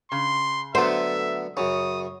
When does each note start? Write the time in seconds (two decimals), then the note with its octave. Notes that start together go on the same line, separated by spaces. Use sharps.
0.12 C#3 C6
0.75 D3 F#3 A3 B3 D4 C5 E5
1.57 F#2 C#3 C#5 D#6